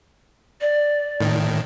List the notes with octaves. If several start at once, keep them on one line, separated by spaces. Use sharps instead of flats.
D5
A2 D#3